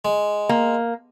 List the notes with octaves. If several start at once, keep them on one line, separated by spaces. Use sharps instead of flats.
G#3
A#3